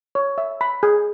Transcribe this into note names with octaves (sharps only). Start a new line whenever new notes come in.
C#5
E5
B5
G#4